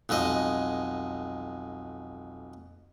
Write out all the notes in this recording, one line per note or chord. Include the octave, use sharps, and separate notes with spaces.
B1 F2 G#3 D#5